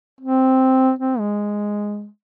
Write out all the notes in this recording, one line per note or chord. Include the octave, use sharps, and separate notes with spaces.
C4
C4
G#3